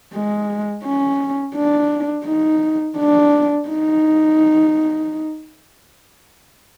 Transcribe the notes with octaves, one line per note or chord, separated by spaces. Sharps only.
G#3
C#4
D4
D#4
D4
D#4